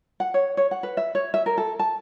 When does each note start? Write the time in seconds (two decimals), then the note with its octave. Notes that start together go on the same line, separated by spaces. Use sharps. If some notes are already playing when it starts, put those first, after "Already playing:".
0.20 F#5
0.34 C#5
0.57 C#5
0.71 F#5
0.83 B4
0.97 E5
1.15 C#5
1.34 E5
1.46 A#4
1.58 A4
1.79 A5